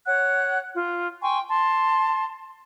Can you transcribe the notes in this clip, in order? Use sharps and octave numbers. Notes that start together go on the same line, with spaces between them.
C#5 F#5 F#6
F4
G5 G#5 C6 C#6
A5 C6